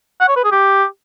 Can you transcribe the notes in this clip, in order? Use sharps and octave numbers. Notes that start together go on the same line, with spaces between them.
F#5
C#5
B4
G#4
G4